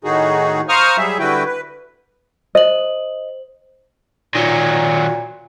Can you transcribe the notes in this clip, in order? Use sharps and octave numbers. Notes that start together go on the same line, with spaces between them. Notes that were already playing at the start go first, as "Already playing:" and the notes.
A2 D#3 D#4 F#4 G#4
C5 F5 A#5 C#6 D#6 F6
F#3 G3 G#4 E5
D3 G3 E4 F#4 B4 G5
B4
C5 D#5 F#7
A#2 D#3 F#3